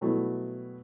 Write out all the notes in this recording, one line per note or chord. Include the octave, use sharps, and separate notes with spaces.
B2 F#3 G3 A3 B3 E4